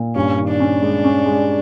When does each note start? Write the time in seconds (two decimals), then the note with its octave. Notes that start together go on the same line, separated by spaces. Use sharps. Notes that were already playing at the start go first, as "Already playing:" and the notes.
Already playing: A#2
0.15 G2 C#4
0.37 D#3
0.49 D4
0.60 C#4
0.82 G#3
1.04 C#4
1.26 G#3